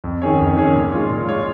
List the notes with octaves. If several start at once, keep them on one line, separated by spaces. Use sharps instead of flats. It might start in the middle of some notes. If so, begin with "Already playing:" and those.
F2
D#3 C#4 G#4 C#5
F2
D#3 C#4 G#4 C#5
A#2
G#3 F4 C#5
A#2
G#3 F4 C#5